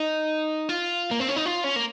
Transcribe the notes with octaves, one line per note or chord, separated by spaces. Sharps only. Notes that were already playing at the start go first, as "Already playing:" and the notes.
Already playing: D#4
F4
A#3
C4
C#4
D#4
F4
C#4
A#3